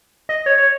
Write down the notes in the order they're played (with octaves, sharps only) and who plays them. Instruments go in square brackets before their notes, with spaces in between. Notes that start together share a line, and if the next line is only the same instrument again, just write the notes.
[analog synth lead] D#5
C#5
C#5